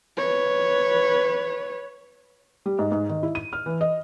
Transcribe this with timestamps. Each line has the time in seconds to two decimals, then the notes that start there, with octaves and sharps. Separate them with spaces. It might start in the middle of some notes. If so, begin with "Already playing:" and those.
0.17 B4 C#5
2.66 G3
2.79 G#2
2.92 G#2
3.09 D#3
3.23 E4
3.35 D#7
3.53 F6
3.66 E3
3.81 D#5